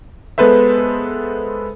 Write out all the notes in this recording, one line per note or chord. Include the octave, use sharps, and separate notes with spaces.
G#3 B3 A4 B4 C5 E5